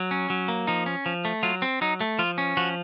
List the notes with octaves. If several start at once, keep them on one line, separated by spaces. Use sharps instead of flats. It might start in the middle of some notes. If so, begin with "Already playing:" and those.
Already playing: F#3
C#4
F#3
A#3
F3 D#4
C#4
F3
A3
F#3 F4
C4
F#3 D#4
A3
F3 F4
C#4
F3 F#4